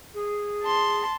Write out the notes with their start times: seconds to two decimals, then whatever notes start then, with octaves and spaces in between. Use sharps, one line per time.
0.14 G#4
0.63 A5 C6